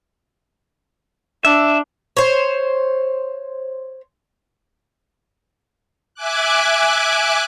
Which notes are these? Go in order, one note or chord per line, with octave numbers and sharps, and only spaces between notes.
D4 E5
C5 C#5
E5 G#5 D6 F#6